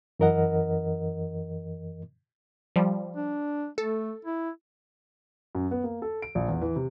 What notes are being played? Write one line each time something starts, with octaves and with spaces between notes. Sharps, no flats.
F#2 E3 A#4 D#5 F#5
F3 G3
D4
A3 A4
E4
F#2
B3
A#3
A4
D7
A#1
E2
E3
C3